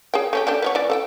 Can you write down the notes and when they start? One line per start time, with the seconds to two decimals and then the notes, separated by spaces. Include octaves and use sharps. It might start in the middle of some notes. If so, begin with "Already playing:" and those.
0.14 G#4 C#5 G5
0.33 A3 C#4 G4
0.47 A3 D4 G4
0.62 B3 G4 C#5
0.75 E3 D5
0.90 A4 F#5 G5